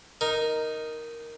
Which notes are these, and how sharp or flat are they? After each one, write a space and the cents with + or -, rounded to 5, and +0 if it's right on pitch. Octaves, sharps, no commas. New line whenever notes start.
D#4 +0 A#4 +0